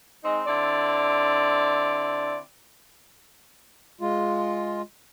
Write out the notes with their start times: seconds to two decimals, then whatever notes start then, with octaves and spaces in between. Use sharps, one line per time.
0.24 G#3 C4 D#4
0.46 D3 C4 E4 D5
4.01 G#3 F4